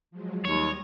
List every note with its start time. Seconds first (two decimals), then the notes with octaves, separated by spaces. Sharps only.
0.11 F3 F#3 G#3
0.45 D#2 G3 C#5 D#6 A#6